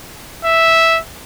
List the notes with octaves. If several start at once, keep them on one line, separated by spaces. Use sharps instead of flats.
E5